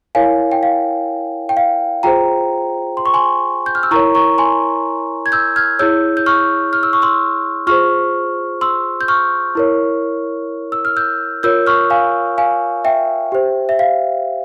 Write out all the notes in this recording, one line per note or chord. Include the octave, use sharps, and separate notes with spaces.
E4 A#4 C#5 F5 G#5
G5
F5
G5
F5
F4 G#4 C5 G5 A#5
C6
C#6
G#5 C6
G6
F6
E6
E4 A#4 C#5 A#5 C#6
A#5 C#6
G#5 C6
G#6
E6 G6
F6 G#6
E4 G#4 C#5 E6 G6
G6
C#6 F6
F6
E6
C#6
C6 E6
F4 G#4 C5 C#6 F6
C6 E6
G6
C#6 F6
E4 A#4 C#5
E6
F6
E6 G6
F4 A#4 C#5 E6 G6
C#6 F6
F5 G#5
F5 G#5
E5 G5
G4 C5
E5
F5